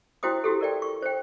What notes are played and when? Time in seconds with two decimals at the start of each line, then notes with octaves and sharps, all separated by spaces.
0.23 E4 F#4 C5 G5 D#6
0.44 E4 F#4 G4 A4
0.61 A#4 D5 G5
0.82 C#6
1.02 C5 G5